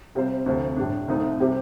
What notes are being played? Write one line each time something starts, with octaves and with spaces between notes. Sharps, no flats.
C3 G3 C4 F4 C5
D2 C3 F3
A2 G3 D4
C2 C3 F3 A3 D#4
C3 G3 C4 G4